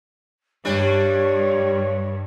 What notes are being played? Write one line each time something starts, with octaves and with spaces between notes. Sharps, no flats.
G2 G3 D4 C#5